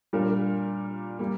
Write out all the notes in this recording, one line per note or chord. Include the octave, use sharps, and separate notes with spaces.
A#2 G3 D4 A#4
G3 A#3